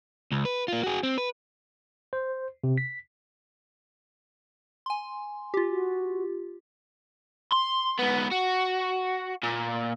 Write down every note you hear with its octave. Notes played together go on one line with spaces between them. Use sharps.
C#2
B4
A#3 F4
F#4 G#4
C4
B4
C5
C3
B6
G#5 C6
F4 G4
F#4
C6
G#2 B3
F#4
A#2